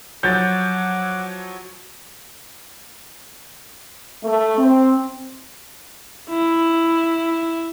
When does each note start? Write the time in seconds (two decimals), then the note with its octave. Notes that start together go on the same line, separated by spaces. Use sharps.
0.23 F3 F#3 C#5 F#5 D6 G6 A6
4.24 A3
4.58 C4
6.30 E4